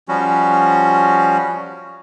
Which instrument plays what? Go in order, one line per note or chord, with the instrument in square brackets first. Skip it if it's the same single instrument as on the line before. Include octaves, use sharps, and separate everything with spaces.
[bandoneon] F3 G3 C#4 F#4